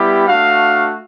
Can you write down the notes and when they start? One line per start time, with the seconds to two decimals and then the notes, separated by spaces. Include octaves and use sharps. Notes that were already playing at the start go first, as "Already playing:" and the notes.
Already playing: G3 B3 E4 G4
0.27 A3 D4 F#4 F5